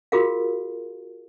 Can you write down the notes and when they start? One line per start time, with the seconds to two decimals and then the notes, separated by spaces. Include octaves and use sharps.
0.12 F4 F#4 G#4 A#4 F5